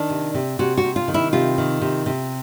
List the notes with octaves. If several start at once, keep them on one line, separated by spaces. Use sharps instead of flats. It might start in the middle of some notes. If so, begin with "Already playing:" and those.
Already playing: D#3 D4
C3
C3
C3 F#4
F#4
C3
F4
D#3
E4
C3 F4
D#3
C3
C3